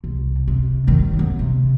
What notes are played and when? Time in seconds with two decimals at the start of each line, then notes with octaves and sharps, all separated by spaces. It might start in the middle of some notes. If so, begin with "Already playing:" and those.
0.04 C2
0.48 C3
0.87 D#3 F#3
1.19 B3
1.39 C3